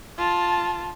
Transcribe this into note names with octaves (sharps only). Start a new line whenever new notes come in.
F4 A5